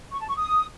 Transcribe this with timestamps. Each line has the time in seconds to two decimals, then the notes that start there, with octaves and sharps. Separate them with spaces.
0.12 C#6
0.20 A5
0.28 C#6
0.37 D#6